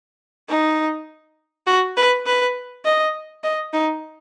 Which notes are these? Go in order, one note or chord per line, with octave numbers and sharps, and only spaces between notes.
D#4
F#4
B4
B4
D#5
D#5
D#4